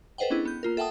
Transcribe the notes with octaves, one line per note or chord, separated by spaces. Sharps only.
A4 B4 C5 D#5 F#5 G5
B3 C#4 D4 E4 G#4
B3 G6
A#3 F4 A#4
A4 E5 F#5 G5 A5 D#6